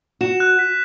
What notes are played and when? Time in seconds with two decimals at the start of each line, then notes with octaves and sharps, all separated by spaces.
0.21 F#4 E7
0.40 F#6
0.59 B6